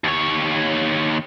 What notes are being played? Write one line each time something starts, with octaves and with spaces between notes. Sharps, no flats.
D#2 C#5